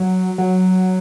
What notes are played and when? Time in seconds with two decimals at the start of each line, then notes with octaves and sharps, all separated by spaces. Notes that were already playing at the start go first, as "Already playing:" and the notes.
Already playing: F#3
0.38 F#3